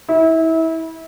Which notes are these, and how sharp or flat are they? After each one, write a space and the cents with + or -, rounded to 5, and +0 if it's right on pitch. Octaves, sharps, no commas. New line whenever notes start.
E4 -25